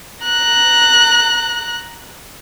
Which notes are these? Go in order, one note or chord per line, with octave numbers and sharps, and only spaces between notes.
A#5 F#6